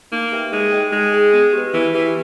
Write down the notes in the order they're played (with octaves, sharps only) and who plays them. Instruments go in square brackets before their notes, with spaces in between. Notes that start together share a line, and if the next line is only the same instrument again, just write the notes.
[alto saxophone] A#3 [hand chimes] D#4
[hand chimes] G4 B4 E5 G5
[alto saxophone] G#3 [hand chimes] D#4
[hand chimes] G#4 D#5 G5
[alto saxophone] G#3 [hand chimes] D#4
[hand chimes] G#4 D#5 G5
B3
G4 B4
[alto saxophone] E3 [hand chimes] B3
[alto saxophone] E3 [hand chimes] G4 B4